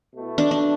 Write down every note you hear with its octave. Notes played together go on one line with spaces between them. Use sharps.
B2 A3 E4
D4
D4